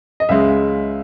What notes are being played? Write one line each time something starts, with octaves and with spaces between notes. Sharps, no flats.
D#5
C#2 C#3 G#3 E5